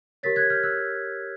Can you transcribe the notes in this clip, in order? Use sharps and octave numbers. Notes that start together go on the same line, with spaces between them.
G4 A#4 C#5 A6 B6
F#6 G#6
F6 G6
E6 F#6